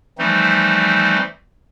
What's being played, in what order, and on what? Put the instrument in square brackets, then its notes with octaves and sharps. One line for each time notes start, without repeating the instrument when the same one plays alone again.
[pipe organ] E3 F3 G3 A3 C4 D#4